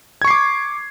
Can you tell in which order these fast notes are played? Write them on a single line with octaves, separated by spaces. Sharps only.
G#6 C#6 C7 D6